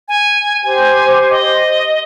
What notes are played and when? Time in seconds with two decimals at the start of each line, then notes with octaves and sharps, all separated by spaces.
0.08 G#5
0.63 G4 C5 G#5
1.30 D#5